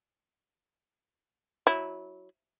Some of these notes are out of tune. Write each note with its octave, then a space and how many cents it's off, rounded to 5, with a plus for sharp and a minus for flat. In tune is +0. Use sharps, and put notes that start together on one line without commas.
F#3 +0 E4 -15